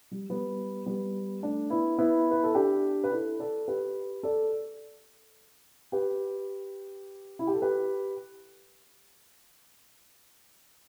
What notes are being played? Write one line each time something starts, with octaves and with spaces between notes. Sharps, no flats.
G3
G3 B3
G3 B3
A3 D4
B3 E4
B3 E4
B4
A4
D4 G4
B4
E4 A4
A4 D5
G4 B4
A4 D5
G4 B4
E4
G4
A4
G4 B4